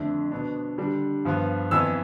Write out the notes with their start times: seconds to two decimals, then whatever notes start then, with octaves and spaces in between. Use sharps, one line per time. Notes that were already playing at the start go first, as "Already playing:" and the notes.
Already playing: F2 D3 A3 D4
0.31 B2 B3 D4
0.78 D3 G3 D4
1.25 G2 F3 B3
1.71 F2 E3 B3 E6